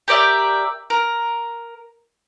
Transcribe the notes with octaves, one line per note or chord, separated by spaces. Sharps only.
G4 A#4 D5 E5
A#4